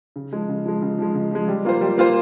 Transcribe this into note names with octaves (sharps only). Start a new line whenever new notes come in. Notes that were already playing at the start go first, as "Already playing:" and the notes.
C#3
F3 G#3
C#3
F3 G#3
C#3
F3 G#3
C#3
F3 G#3
G3
A#3 F4 C5
G3
A#3 F4 C5